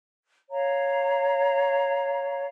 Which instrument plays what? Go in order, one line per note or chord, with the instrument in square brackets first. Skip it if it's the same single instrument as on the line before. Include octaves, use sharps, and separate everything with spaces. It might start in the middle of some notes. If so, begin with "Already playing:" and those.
[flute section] C#5 F5 A#5